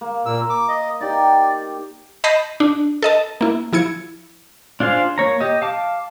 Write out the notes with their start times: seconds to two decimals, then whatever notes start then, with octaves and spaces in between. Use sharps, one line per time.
0.01 A#3
0.26 A#2 A#4 E6
0.50 D6
0.68 D#5
1.01 D#4 G4 D5 G5
2.24 D#5 A5 B5 G6 A#6 C7
2.60 D4
3.02 A4 D#5 A5
3.41 A#3 E4
3.73 F3 E4 G#6 C#7
4.80 D4 F4 G#4 C5 F5
5.18 A#3 C#5 A#5
5.40 G4 D#5
5.62 F5 A5 D6